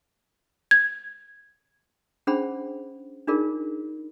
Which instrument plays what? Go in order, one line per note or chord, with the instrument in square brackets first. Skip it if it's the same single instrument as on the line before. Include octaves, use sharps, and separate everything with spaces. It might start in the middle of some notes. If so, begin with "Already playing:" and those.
[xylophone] G#6
[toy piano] C#4 D4 G#4 C5 F#5 B5
D4 D#4 F4 G#4 A#4 D5